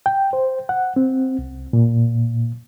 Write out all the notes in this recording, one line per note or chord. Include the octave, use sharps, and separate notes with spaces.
G5
C5
F#5
C4
C2
A#2